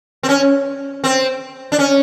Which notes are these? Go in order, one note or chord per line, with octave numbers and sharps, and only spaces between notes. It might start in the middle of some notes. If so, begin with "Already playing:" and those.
C4
C#4
C4
D4
C#4